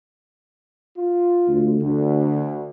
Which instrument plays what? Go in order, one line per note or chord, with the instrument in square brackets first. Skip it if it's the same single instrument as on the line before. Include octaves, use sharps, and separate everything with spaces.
[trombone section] F4
[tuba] D2
[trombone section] D2 [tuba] D3